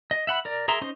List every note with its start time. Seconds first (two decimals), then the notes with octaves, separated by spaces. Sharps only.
0.11 D#5
0.27 E5 F#5 B5
0.45 A#4 D5
0.68 G#4 A#4 E5 A#5 C6
0.82 C#4 D#4 C5 D#5 C6